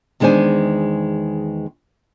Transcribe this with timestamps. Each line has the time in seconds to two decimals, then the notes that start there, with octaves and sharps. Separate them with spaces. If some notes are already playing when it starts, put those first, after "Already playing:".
0.20 E2 D#3 G#3 D4 C5 G#5